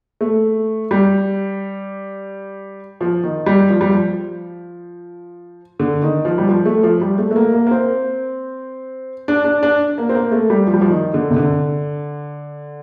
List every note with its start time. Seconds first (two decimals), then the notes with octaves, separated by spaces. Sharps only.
0.21 A3
0.91 G3
3.01 F3
3.23 D#3
3.46 G3
3.70 F3
3.81 G3
3.91 F3
5.80 D3
6.02 D#3
6.25 F3
6.38 G3
6.49 F3
6.65 A3
6.83 F3
7.01 G3
7.18 A3
7.31 A3
7.36 A#3
7.53 A#3
7.67 A#3
7.71 C4
9.28 D4
9.45 D4
9.63 D4
9.98 A#3
10.09 C4
10.15 A#3
10.32 A3
10.50 G3
10.67 F3
10.74 G3
10.81 F3
10.90 D#3
11.14 D3
11.30 C3
11.36 D3